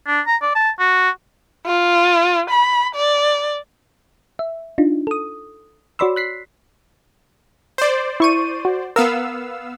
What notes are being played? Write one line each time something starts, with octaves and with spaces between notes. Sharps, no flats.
D4
A#5
D5
A5
F#4
F4
B5
D5
E5
D4 D#4 F4
A4 D#6
F#4 C#5 D5 B5 C6 E6
F#6 B6 C7
C5 D5
E4 C#6 D#7
F#4
B3 A#4 F5 E6